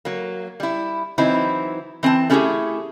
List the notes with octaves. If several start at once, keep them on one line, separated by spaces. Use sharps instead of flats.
F#3 A#3
G3 E4
E3 F#3 C4 D#4 E4
E3 C4 G5 A5
A3 C#4 E4 F4 G4 G#4